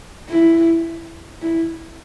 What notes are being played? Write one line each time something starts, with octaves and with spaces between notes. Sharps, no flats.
E4
E4